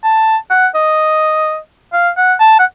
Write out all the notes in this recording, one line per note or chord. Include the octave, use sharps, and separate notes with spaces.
A5
F#5
D#5
F5
F#5
A5
F#5